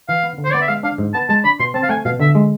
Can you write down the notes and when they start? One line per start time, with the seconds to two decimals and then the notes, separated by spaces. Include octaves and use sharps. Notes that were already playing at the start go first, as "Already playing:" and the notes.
0.08 E3 F5
0.23 B3
0.38 D3
0.44 C5
0.52 B3 D5
0.61 E5
0.68 G#3 F5
0.83 D4 F5
0.98 G#2
1.14 B3 A5
1.29 G#3 A5
1.44 D4 B5
1.60 B2 C6
1.74 C4 A5
1.83 F5
1.89 A3 G#5
2.05 B2 F5
2.20 D3 E5
2.35 G#3